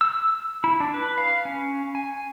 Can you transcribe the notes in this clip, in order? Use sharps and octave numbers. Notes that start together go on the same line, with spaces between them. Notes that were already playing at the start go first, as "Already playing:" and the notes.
E6
E4
D4
B4
F5
C#4
G#5